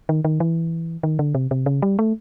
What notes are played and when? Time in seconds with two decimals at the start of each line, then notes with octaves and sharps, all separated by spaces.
0.09 D#3
0.25 D#3
0.40 E3
1.03 D#3
1.19 D3
1.35 C3
1.51 C3
1.66 C#3
1.82 G3
1.99 A3